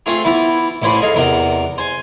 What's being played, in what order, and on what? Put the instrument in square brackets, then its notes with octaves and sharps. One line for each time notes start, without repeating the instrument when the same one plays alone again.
[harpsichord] A3 C4 F4 G#4
E3 B3 E4
A1 A2 E3 C5 G#5 B5
G#4 A4 D#5 F5
E2 C3 A#4 F#5
C5 G#5